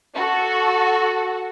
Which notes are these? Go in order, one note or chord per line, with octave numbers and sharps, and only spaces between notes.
F#4 A4